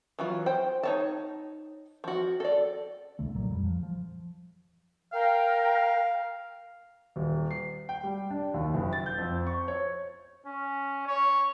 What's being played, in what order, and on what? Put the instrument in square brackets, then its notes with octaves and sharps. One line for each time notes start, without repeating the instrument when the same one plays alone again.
[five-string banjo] E3 F#3 F4
C5 G5
D#4 C#5 A5
F3 F#4
A4 D5
[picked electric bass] D#1 C2 D3 A3
B1 A#2 F#3
D#1 F2 F#3 G3
F3
F3
[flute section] A#4 G5 [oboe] F5
[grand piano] D#1
C7
G5
G3
D4
D#2
F#1
A6
G6
F2
C#6
C#5
[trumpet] C#4
C#5